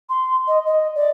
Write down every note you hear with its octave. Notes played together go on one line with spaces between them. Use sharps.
C6
D#5
D#5
D5